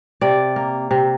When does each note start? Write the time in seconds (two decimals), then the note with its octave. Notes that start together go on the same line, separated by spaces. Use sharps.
0.21 C3 D5
0.56 A#3
0.91 C3